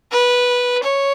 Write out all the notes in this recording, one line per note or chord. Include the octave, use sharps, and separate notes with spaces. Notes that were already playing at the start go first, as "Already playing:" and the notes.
B4
C#5